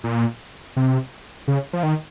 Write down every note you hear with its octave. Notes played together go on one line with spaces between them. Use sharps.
A#2
C3
C#3
F3
D#3